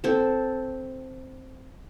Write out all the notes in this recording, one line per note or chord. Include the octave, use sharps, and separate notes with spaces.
C4 A4